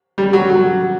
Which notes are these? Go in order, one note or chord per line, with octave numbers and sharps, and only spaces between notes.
G3
F#3
F#3